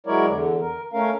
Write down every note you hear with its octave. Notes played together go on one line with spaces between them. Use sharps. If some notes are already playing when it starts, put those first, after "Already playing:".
F#3 G#3 E4 A#4 C#5 D5
E2 D3
A#4
A3 C#4 A#4 F5